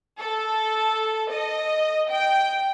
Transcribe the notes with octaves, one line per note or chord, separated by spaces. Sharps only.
A4
D#5
G5